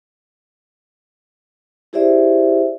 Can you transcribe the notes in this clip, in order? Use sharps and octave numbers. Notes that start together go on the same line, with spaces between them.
E4 G4 G#4 C5 D5 E5